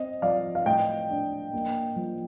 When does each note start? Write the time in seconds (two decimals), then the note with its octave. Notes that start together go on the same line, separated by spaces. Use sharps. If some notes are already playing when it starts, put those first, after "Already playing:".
Already playing: C4 D#5
0.22 F3 D5 F5
0.55 F5
0.65 A2 D#5 G5
1.10 D4
1.53 A#3
1.96 F3